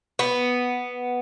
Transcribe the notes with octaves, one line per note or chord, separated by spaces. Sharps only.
B3